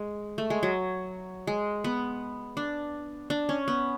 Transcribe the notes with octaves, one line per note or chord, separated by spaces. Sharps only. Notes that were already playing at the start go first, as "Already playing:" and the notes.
Already playing: G#3
A3
G#3
F#3
G#3
B3
D4
D4
C#4
B3